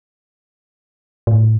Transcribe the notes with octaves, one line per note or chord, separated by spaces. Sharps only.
A2